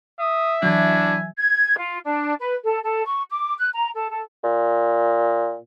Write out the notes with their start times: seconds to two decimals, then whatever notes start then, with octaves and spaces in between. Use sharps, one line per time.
0.20 E5 D#6
0.63 E3 F#3 D4 E4 F#4 G#5
1.38 G#6
1.78 F4
2.04 D4
2.39 B4
2.65 A4
2.83 A4
3.04 C#6
3.30 D6
3.59 F#6
3.74 A#5
3.94 A4
4.10 A4
4.44 A#2